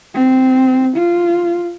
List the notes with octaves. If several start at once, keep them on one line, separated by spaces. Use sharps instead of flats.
C4
F4